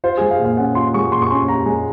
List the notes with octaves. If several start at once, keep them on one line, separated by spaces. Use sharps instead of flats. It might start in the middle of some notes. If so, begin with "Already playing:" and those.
F4 C5
G#3 G#4
F5
A#2
F5
C#4 F#5
F4 C6
G#3 C#6
A#2 C6
C#6
C#4 C6
F4 A#5
G#3